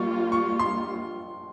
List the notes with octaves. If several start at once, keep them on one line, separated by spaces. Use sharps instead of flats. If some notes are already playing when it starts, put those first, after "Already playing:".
Already playing: G3 A#3 F4 C#6
C#6
C6